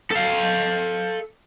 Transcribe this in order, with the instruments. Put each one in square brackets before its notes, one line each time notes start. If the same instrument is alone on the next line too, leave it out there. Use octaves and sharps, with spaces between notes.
[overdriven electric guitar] A4 F5